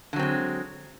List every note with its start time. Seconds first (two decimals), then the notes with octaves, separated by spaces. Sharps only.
0.13 D3
0.16 F#3
0.19 C4
0.23 G#3